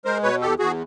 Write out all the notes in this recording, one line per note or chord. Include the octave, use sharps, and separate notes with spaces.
G#3 A#4 C5
B2 B4 C#5
E2 G4 A4
E2 F#4 G#4